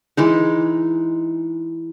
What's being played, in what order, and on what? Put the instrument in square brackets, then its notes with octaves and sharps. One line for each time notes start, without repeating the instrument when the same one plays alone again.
[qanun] E3 G#3 D#4